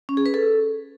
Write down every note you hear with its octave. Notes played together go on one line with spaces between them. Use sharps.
C#4
G#4
B4
A4